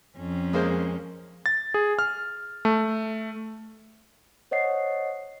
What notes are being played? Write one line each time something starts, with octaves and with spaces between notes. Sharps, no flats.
F2 C#4
G#3 A#3 C5
A6
G#4
F6
A3
C5 C#5 D#5 F#5 C7